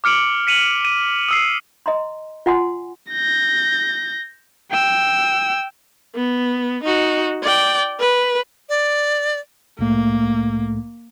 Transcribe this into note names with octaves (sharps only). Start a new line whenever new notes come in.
D6 F6 C#7 D7 F#7
B6 C#7 D#7 F7 F#7
D#7
D#6 E6 C7
D#5 A#5 C6
F4 F#5 G#5 C6
G6 A#6
G5 E6
B3
D#4 F#4
D5 G5
B4
D5
C2 A2 A3 A#3